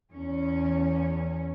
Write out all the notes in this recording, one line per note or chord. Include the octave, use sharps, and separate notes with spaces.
E2 C#4